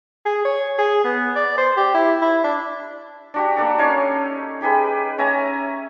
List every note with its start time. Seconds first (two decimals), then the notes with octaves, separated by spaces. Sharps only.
0.26 G#4
0.45 C#5
0.78 G#4
1.04 B3
1.36 D5
1.57 C5
1.77 G4
1.94 E4
2.22 E4
2.44 D4
3.34 D4 F#4 G4
3.57 A#3 D4 A4
3.79 C#4 D#4 C#5 F5
4.61 D#4 G4 G#4 B4
5.18 C#4 E5 G#5 A#5